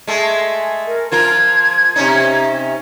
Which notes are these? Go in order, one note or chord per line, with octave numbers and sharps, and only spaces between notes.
G#3 A3
A#4
F3 F4 A#4 G#6
C3 C#4 D#4